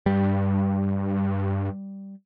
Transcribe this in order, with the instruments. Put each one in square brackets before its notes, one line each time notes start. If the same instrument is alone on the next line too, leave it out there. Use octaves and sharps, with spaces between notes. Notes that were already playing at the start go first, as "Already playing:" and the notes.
[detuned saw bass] G2 [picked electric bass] G3